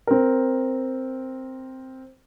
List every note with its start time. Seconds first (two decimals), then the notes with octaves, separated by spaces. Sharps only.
0.07 C4 A#4